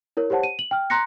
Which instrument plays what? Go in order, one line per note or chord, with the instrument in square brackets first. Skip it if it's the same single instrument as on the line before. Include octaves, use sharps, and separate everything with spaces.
[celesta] E4 A#4 C#5
G4 C5 C#5 F#5 A5
D#7
F#7
G5 F6
A#5 C6 F#6 A#6 C#7